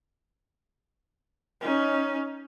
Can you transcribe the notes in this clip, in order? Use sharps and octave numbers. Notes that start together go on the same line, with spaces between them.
C#4 D#4